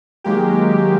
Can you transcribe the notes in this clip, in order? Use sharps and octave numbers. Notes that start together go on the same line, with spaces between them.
D#3 F#3 G#3 A#3 G4